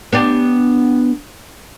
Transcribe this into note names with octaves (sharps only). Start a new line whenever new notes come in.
B3 D4 G4